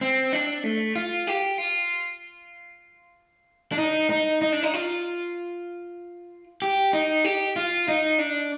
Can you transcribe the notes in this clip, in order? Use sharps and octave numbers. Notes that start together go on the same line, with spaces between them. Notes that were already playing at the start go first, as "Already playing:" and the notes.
C4
D4
A3
F4
G4
F4
D4
D#4
D#4
D#4
D4
D#4
F4
G4
D#4
G4
F4
D#4
D4